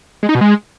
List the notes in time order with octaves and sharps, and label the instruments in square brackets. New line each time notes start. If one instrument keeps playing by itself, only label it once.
[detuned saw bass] G#3
D#4
B2
G#3